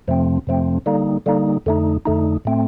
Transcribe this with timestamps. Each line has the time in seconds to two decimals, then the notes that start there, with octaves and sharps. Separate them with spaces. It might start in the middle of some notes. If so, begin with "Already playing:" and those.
0.08 F2 C3 F3 A3 C4
0.47 F2 C3 F3 A3 C4
0.86 D3 G3 A#3 D#4
1.26 D3 G3 A#3 D#4
1.66 F2 D3 A3 D#4
2.05 F2 D3 A3 D#4
2.45 A2 A3 C4